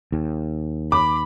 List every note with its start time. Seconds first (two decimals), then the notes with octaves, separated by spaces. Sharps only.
0.12 D#2
0.92 B5 D6